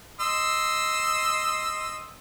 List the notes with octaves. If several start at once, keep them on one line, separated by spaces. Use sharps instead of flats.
D#5 C6 E6